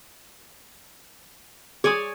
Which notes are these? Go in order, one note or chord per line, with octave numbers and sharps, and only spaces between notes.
G#4 C#5 D5 G#5 D#6